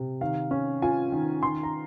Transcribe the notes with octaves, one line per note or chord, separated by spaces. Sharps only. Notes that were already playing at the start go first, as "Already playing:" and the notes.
Already playing: C3
D#3 F5
C#4
F4 G#5
D#3
D#3 C6
A#5